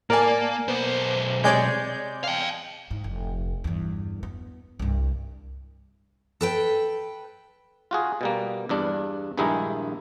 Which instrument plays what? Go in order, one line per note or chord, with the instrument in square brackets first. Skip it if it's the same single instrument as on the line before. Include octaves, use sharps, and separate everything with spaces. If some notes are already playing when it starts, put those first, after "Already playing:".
[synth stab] A2 D5 A5 [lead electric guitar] A#3 [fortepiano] A#4 G#5
[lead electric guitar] B1 C5 [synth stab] B3
[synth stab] C3 D5 G6 [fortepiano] G#3 G#4 C#5
[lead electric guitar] F5 G5
[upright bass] G#2
F1
E2 G2
B3
C2 G2
[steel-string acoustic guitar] A4 B4 G5
[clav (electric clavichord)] F4 F#4 G#4
B2 G3 A#3
E2 G2 D4
A#1 G2 D#3 G#3 D#4 E4